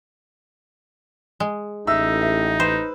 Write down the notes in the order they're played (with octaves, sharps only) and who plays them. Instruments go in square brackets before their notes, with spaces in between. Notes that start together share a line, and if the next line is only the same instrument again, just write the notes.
[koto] G#3
[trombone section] A1 [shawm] D#4 [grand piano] E5 E6
[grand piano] E5
[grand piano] B4 [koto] C5